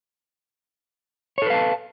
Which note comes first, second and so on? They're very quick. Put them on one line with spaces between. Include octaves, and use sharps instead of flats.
C#5 A4 B4 F5 A5